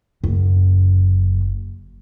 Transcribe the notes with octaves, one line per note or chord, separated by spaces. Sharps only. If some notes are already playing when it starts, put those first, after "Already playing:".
F#1 F#2